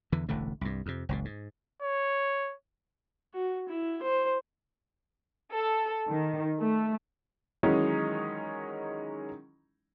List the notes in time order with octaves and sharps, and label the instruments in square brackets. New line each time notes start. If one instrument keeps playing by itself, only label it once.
[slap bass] E2 D3 E3
E1 A1 D3 A3
C2 G2
F2 C3
F#1 C#2 A#2
G#2
[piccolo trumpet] C#5
[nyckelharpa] F#4
E4
C5
[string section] A4
D#3
A3
[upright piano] D#3 E3 F#3 G#3 C#4 D#4